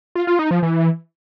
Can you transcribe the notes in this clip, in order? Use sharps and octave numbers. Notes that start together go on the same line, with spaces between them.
F4
F4
D#4
F3
E3